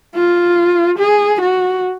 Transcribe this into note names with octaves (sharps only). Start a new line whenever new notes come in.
F4
G#4
F#4